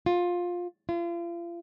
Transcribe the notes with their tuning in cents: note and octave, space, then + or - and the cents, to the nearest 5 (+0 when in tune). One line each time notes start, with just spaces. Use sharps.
F4 +15
F4 -35